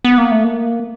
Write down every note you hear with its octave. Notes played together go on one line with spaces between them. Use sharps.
B3
A#3
A3
A#3